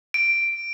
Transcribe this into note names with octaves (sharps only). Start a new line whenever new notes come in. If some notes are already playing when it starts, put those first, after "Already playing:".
D7